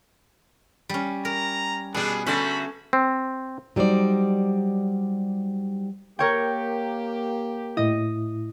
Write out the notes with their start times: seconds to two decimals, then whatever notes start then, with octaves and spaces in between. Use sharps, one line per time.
0.89 G3 C#4
1.25 A#4 A#5
1.94 B2 G3 B3 D4 G#4
2.27 D3 A3 C#4 F#4 A5 B5
2.93 C4
3.76 F#3 G3 D#4 C5 D5
6.19 A#3 G4 A#4 C#5 G5
7.77 A2 E4 D#5